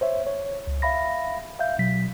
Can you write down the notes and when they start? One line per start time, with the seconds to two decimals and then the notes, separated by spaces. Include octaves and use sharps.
0.01 C5 C#5 E5
0.27 C#5
0.67 C#2
0.82 E5 F5 B5 A#6
1.59 E5 F5 G6
1.79 B2 F#3 B6